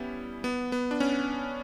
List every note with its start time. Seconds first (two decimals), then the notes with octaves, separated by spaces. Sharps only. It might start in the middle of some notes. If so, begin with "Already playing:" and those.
Already playing: G3 B3 C#4 E4
0.44 B3
0.72 B3
0.91 D4
1.00 C#4